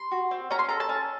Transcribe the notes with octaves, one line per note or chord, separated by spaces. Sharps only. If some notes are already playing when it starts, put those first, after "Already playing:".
Already playing: C6
F#4
C4
C#4 A#5
C6
A4 A#5
A5
C#4